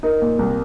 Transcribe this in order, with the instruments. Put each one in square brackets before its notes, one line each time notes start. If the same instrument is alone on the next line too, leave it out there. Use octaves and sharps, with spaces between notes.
[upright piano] D#4 [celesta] A#4
[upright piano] A#2
C2